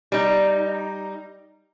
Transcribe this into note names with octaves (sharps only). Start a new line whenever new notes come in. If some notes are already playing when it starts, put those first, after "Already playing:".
G3 D#4